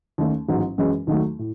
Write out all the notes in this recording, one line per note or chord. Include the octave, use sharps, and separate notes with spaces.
D#2 D#3 A3 C#4
A1 G#2 F#3
F#2 E3 G#3 C#4
D#2 D#3 F#3 A3
A2